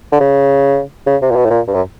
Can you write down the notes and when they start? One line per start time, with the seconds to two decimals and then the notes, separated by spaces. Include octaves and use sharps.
0.12 D3
0.20 C#3
1.07 C#3
1.22 C3
1.31 A#2
1.36 B2
1.45 A2
1.50 A#2
1.68 G2
1.74 F#2